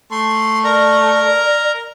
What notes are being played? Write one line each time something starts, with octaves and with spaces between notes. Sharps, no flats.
A3 C6
A#4 D5 A#5